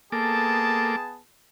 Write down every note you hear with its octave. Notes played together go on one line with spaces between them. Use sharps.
A#3 B3 G#4 A4 A5 D6